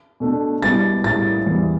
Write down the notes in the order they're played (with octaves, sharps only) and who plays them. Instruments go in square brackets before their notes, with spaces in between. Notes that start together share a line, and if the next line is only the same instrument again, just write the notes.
[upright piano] B2 A3 D4
[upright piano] B2 G3 B3 E4 [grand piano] A6
[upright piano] A2 G3 E4 [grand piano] A6
[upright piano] E2 E3 G3 E4